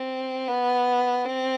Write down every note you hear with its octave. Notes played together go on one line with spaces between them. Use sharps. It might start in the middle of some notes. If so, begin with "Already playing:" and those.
Already playing: C4
B3
C4